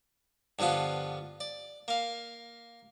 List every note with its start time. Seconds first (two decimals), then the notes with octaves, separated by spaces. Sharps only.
0.59 G2 D3 F3 B3 F4
1.41 D5
1.88 A#3 F5